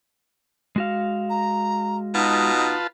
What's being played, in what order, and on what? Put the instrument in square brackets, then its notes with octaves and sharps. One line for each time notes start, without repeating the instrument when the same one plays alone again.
[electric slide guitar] G#3 F#4 F5
[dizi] A#5
[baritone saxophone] B2 [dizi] D#4 [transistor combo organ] F4 B4 A5